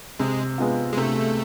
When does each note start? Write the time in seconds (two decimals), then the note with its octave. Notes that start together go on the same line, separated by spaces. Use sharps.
0.19 C3 G#3
0.58 G#3 B3 F4
0.93 G#3
0.97 C3 A3